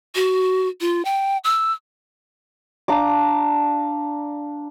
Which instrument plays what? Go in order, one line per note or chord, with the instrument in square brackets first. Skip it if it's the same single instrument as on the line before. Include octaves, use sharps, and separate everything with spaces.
[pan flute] F#4
F4
G5
E6
[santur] D4 F5 A#5 D6